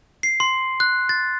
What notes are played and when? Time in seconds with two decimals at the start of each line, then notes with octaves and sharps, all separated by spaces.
0.23 C7
0.40 C6
0.80 F#6
1.09 A6